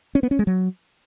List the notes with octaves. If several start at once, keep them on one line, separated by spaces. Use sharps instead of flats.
C#4
B3
C#4
G#3
F#3